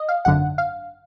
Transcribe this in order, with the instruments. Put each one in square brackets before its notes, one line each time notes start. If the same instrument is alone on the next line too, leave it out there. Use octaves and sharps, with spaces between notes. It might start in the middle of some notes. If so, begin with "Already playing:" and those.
Already playing: [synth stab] D#5
F5
G#1 F#2 D3 F#5
F5